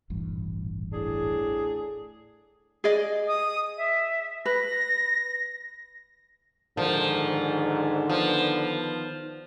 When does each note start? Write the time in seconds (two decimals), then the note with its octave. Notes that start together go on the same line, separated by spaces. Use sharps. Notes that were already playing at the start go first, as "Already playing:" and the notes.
0.10 D#1 A1 G2
0.93 A2 D4 G#4
2.84 G#4 D5 D#5
3.28 D#6
3.77 E5
4.45 B4 A#6
6.77 G#2 D3 D#3 F3
8.09 F3 B3